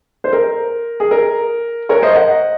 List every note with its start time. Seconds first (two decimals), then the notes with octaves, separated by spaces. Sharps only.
0.24 C5
0.33 A#4
1.00 G#4
1.11 A#4
1.89 A#4 C#5
2.02 C5 D#5
2.16 D#5 F#5